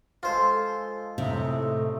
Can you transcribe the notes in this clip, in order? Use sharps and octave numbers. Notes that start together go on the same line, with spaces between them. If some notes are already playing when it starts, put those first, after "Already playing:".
F3 G#3 F4 A4 C5
A2 C3 D#4 E5 F5
A3